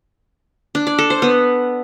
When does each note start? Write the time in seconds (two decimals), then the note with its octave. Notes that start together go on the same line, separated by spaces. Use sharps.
0.75 D4
0.87 D5
0.98 A4
1.10 C5
1.22 B3